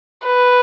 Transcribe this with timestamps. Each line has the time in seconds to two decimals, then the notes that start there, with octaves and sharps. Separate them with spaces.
0.27 B4